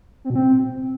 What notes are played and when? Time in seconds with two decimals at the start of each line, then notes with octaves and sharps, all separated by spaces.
0.25 C4
0.30 B2
0.36 C4